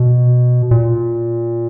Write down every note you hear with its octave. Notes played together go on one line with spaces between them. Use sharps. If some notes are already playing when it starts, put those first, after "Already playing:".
Already playing: B2
A#2